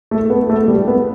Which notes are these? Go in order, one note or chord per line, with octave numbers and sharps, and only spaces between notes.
A3
B3
A3
G3
B3